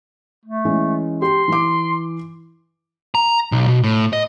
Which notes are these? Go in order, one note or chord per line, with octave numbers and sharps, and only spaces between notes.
A3
E3 G#3 C#4
G4 C6
E3 D6
A#5
B1
B2
A2
D#5